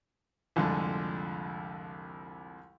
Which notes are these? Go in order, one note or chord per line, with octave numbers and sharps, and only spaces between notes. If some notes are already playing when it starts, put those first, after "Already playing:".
C2 F2 D3 F3 G#3